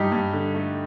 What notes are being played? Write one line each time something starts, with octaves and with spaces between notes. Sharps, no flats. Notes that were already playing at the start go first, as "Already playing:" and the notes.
Already playing: G2 D#4 G4
G2
D3
A3